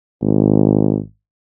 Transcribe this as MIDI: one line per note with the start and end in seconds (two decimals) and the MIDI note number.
0.22 0.98 32